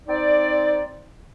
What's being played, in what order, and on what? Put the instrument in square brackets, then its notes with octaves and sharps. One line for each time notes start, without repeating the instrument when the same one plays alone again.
[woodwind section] C4 D#4 D5